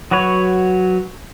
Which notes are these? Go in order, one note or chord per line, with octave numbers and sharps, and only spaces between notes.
F#3 F#4 B4 C#5